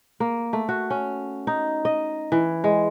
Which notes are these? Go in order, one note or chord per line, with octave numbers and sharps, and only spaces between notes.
A#3
A3
F#4
C#4
D#4
D#5
E3
G#3